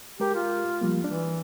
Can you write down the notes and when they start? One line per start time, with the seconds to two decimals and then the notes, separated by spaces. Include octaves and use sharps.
0.20 G#3 G4 A#4
0.35 F4
0.81 F3 G3 A#3
1.04 E3 D4